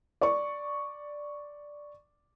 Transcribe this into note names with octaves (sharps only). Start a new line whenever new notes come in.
D5 C#6